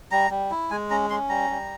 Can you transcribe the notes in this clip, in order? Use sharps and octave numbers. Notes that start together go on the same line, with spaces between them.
G3 A#5
G3
E4
G#3 G#5
C#4 A#5
C#4 C6
G3 A#5
G3